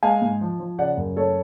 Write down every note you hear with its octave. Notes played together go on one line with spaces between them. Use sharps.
G#3 F5 G#5
G#2
F3
F3
C#3 D5 F#5
F#2
A3 A4 C#5